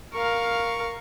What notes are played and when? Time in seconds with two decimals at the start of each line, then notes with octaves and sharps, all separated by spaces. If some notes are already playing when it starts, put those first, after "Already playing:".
0.14 A#4 F5 C#6